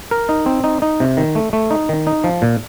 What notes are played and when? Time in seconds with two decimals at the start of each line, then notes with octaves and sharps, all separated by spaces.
0.11 A#4
0.29 D#4
0.46 C4
0.64 D#4
0.82 D#4
1.00 C3
1.17 D#3
1.35 A3
1.53 A3
1.71 D#4
1.89 D#3
2.07 D#4
2.24 F3
2.42 A#2